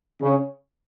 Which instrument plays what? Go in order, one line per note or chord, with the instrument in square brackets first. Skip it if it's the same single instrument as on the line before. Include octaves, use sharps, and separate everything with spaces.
[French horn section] C#3 C#4